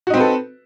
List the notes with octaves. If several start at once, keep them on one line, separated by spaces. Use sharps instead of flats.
C4 D#4 F#4 A4 B4